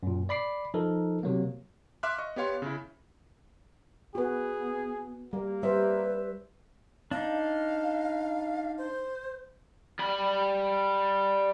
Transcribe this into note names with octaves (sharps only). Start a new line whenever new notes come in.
F#2 A#2
D5 B5 D6 C7
F3 D#4 A4 A#4
C3 F#3 A#3
E5 F5 C6 D6 F6 F#6
D#5 C#6
B3 G4 C#5 F5 C6
C#3 E4
B3 F#4 G#4 B4
G3 A#3
G3 B4 C5 E5
D4 D#4 F5
C5
G3 B5